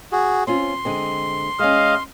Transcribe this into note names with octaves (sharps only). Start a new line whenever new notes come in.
F#4 G#4
C4 C#4 F4 C6
D3 G#3 C4
G#3 C#4 D#5 F5